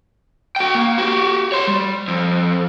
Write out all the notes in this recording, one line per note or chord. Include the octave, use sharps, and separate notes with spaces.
F#4 G5
A#3
F#4 G4
C#5 C6
G3
F2